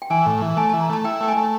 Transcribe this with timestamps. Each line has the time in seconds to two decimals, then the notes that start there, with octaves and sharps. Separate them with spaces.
0.02 G5
0.10 E3 G#5
0.26 A2
0.42 E3
0.57 A3 G#5
0.69 E3 A5
0.81 A#5
0.89 A3 A5
1.04 E4 G5
1.21 A3 G5
1.28 G#5
1.37 A3